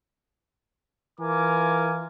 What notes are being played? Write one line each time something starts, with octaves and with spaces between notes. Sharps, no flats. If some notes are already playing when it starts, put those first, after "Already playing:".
E3 F4 A#4 G#5 D6